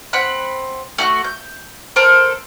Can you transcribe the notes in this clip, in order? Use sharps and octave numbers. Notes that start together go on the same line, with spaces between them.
C4 F#5 B5 F#6
A3 F#4 F#6
G6
A4 A#4 C5